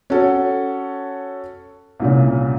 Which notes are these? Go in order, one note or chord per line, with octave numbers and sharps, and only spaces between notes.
C#4 F#4 A4
C2 A#2 C#3